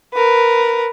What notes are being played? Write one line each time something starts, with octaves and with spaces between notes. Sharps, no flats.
A#4 B4